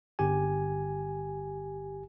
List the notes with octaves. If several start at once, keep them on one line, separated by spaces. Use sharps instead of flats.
G1 G4 G#5